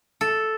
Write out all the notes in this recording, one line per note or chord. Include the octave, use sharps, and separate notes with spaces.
A4